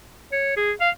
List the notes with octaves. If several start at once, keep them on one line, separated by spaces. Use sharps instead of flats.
C#5
G#4
F5